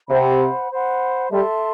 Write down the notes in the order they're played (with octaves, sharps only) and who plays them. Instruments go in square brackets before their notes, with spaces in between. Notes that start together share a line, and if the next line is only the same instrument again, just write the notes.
[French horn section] C3 [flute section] C5 F#5 B5
[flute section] C5 F#5 B5
[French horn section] G3 [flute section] A4 E5 A5 C6